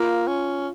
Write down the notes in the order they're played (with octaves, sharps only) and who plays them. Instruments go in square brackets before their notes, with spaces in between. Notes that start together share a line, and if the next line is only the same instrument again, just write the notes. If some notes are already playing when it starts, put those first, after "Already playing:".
Already playing: [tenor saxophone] A#3 [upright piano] F4
[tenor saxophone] C#4